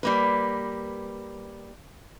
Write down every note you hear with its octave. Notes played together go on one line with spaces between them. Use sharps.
G3 A#3 B4